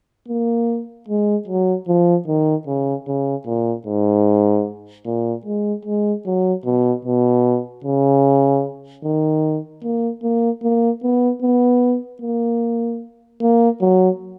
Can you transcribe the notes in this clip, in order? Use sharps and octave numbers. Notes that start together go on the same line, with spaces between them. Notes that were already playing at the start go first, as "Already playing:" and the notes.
A#3
G#3
F#3
F3
D#3
C#3
C#3
A#2
G#2
A#2
G#3
G#3
F#3
B2
B2
C#3
D#3
A#3
A#3
A#3
B3
B3
A#3
A#3
F#3